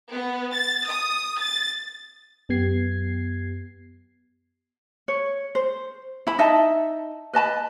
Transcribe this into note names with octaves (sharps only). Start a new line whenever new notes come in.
B3
A6
D#6
A6
F#2 B3 G4 G#6 C7
C#5
C5
E4 B5
D#4 D#5 E5 A5
B4 D#5 A5 B5